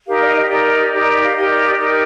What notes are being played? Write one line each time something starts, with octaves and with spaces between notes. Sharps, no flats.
D#4 G4 A#4 F5
D5
D#5
D#5
D#4 G4 A#4 D5
D#4 G4 A#4
F5
D#4 G4 A#4 D#5
D5
D5
D#4 G4 A#4 D5